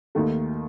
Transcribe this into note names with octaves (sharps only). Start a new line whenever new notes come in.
D#2 D#3 A3